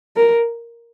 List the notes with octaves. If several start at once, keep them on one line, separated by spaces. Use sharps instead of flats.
A#4